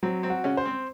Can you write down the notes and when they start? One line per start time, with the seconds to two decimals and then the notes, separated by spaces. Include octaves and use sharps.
0.03 F#3 C4
0.23 C4
0.30 F#4
0.44 C#3 C#4
0.57 C5
0.65 C4